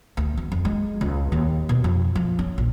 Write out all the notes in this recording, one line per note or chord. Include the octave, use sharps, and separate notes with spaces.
D2
E2
F2
G#3
C#2
D#2
B2
F2
F3
C#4
A#1